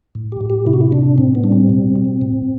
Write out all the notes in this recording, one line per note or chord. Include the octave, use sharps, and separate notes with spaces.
A2
G4
A2
G4
C3 E4
F#4
E4
C3 D4
A2 C4
B3
G3 D4
C4
B2
B2
A2